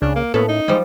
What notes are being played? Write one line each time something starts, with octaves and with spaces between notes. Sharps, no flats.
C#2 C#3 D4
A#3
A2 A#3 B3 C#4 A4
D#4
F3 G3 G#3